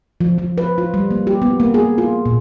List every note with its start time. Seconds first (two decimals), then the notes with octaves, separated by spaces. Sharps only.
0.21 F3
0.38 F3
0.58 B4
0.78 F4
0.94 G3
1.11 A#3
1.27 G4
1.42 B3
1.60 A#3
1.74 G#4
1.98 F4
2.26 A#2